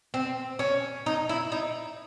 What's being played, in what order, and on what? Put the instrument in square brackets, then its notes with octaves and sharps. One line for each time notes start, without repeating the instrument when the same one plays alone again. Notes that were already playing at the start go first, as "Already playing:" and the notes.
[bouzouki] C4
C#4
D#4
E4
D#4